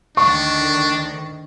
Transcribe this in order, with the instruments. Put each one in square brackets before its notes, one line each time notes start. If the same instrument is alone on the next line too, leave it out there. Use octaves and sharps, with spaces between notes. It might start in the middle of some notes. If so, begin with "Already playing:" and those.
[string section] D2 D#3 [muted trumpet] D4 [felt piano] C#6